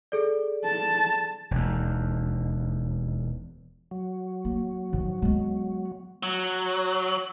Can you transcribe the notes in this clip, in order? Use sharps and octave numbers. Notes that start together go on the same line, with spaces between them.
G#4 A4 D5
A5
E1 D#2
F#3
A#3
D#3 F3
G#3 B3
F#3